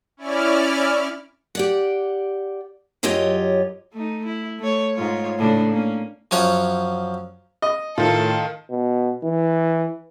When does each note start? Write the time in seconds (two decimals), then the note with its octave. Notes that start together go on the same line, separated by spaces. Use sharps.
0.17 C#4 E4 D5 F6
1.55 G4 D5 F#5
3.03 F#2 F#3 F4 G4 C#5 D#5
3.93 A3 D#4
4.25 E4
4.59 A3 C#5
4.94 G#2 F4 C#5
5.39 A2 C#3 D4
5.70 A#3 C#4
6.31 F#2 F3 C#5 F#5
7.62 D#5
7.98 A2 D#3 F4 A4
8.70 B2
9.23 E3